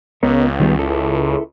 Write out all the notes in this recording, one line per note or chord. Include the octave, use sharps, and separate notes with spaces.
C#2 B3 A#4 C#5
D#3 G3 B3
E4 A4